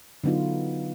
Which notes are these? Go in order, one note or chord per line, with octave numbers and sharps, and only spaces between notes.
D3 F#3 B3 D#4 F4